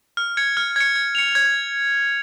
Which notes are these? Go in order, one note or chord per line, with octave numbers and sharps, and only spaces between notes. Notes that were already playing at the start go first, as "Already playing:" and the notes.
F6
G#6 C#7
F6
G#6 C#7
G#6
C#7 F7
G#6